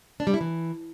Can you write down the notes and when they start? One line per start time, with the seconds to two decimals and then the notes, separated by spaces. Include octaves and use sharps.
0.20 D4
0.27 G3
0.34 E4
0.41 E3